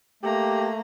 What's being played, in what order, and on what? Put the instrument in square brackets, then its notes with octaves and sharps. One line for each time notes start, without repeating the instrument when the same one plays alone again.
[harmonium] A3 [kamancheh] A#3 A#5 [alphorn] G4